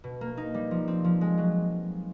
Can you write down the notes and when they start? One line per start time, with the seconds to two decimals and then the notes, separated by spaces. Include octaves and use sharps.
0.04 B2
0.21 A#3
0.37 D#4
0.54 G3
0.71 F3
0.88 C4
1.04 F3
1.21 G#3
1.38 F#3